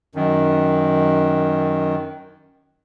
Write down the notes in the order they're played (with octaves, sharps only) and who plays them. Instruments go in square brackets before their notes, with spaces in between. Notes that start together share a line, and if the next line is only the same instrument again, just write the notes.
[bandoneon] F#2 D#3